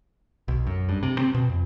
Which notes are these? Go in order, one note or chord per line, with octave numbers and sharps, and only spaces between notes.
B1
F#2
G2
C3
C4
B2
F2